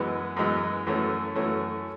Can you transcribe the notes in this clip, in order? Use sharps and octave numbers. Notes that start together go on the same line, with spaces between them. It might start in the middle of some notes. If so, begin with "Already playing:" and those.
Already playing: F#2 E3 G#3 B3
F#2 E3 G#3 B3
F#2 E3 A3 C#4
F#2 E3 A3 C#4